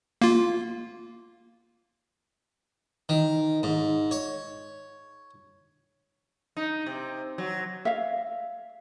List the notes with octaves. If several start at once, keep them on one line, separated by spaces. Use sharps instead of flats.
A#3 F4
D#3
G#2
C#5
D#4
C3
F#3
E5 F5